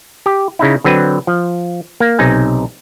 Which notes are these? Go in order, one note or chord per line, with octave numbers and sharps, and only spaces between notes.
G4
C#3 D#4 E4
D3 F#3 C4 B4
F3
A#3
B1 C3 D#4 G#5